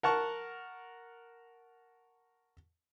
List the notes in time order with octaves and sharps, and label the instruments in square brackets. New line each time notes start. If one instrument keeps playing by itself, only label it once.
[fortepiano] A#4 F#5 A5 C#6